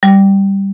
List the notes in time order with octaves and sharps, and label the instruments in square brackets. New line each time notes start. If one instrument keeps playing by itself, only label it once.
[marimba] G3